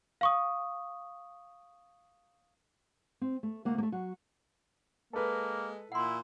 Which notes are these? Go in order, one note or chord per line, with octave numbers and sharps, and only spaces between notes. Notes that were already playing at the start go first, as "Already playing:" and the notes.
F5 C#6 D#6
C4
A3
D2 A#3 F#5
A3 A#3
F#3 F#4
G#3 A#3 A4 B4
A#2 E4 F#5 C6